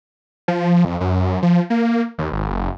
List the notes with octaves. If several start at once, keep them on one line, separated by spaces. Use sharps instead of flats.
F3
F2
F#2
F3
A#3
D#2
G#1
F#1